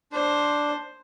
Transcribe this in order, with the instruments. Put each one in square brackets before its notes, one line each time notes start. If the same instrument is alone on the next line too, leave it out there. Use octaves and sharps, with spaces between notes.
[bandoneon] D4 [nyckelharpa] C5